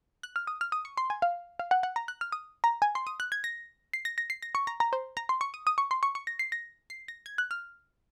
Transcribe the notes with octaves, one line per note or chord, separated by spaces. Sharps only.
F#6
F6
D#6
F6
D#6
C#6
C6
G#5
F5
F5
F#5
F#5
A#5
F#6
F6
D#6
A#5
G#5
C6
D#6
F#6
G#6
A#6
C7
A#6
A#6
C7
A#6
C#6
A#5
A#5
C5
A#5
C6
C#6
D#6
D#6
C#6
C6
C#6
C#6
A#6
C7
A#6
C7
A#6
G#6
F#6
F6